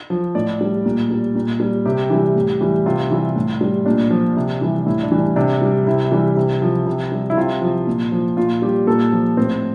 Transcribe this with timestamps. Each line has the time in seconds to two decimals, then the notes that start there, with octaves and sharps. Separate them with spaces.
0.10 F3
0.35 A2 D5
0.61 G3
0.85 A#2
1.11 G3
1.35 A#2
1.60 G3
1.85 C3 G4
2.10 E3 G3
2.36 A2
2.61 E3 G3
2.86 C3 F4
3.11 E3 G3
3.36 A2
3.61 G3
3.86 A#2 D4
4.11 F3
4.37 C3
4.61 E3 G3
4.86 A2 E4
5.03 D4
5.12 E3 G3
5.19 D4
5.36 C3 D4
5.62 G3
5.86 C3 E4
6.12 E3 G3
6.37 C3
6.62 F3
6.87 C3
7.12 G3
7.30 E4
7.37 C3 F4
7.62 F3
7.87 A#2
8.12 F3
8.37 A#2 F4
8.62 G3 G4
8.87 A#2 A4
9.12 F3
9.37 A2 C4